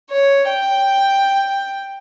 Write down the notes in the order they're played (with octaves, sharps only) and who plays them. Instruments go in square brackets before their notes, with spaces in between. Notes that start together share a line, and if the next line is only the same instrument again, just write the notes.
[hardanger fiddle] C#5
G5